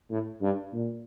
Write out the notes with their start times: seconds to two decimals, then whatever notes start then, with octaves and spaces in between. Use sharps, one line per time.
0.10 A2
0.42 G2
0.73 A#2